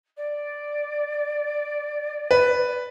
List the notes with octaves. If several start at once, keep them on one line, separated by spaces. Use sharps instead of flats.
D5
B4